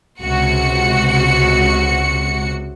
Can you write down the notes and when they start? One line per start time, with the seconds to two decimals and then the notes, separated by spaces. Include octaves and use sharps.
0.24 C#2 C3 F#4 C#7